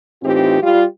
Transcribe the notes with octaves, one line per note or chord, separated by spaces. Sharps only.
A2 E3 C4 D#4 F4 G4
G3 F4